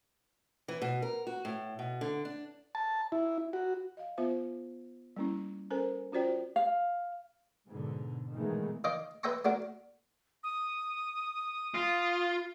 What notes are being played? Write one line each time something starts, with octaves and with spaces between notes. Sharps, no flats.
E3
B2
A#4
F#4
A2
B2
D3
D4
A5
E4
F#4
D#5 F5
B3 F4 C5 E5
G3 A#3 C#4 E4
C#4 A4 A#4 C5 G#5
C#4 F4 F#4 C5 D5 G5
F5
G#2 B2 D3
A#2 D#3 E3 G#3 A3 B3
D#3 D#5 F5 D6
B4 C5 E5 G5 A#5 C#6
A3 D4 F#4 A#4
D#6
F4